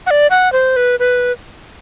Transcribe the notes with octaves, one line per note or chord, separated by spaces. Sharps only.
F#5
D5
F#5
C5
B4
B4